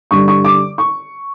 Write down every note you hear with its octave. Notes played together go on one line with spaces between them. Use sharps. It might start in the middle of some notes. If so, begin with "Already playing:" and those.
G2 D3 G3 C#6
C#6
D6
C#6